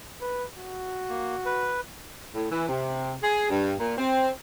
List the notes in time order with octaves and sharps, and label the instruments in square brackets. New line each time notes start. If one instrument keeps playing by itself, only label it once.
[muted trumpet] B4
F#4
[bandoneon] A#3
B4
[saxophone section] A2
E3
C3
G#4
G2
A#2
C4